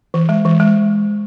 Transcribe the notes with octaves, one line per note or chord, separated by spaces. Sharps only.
E3
G#3
E3
G#3